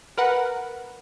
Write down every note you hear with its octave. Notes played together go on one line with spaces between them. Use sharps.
A#4 B4 F#5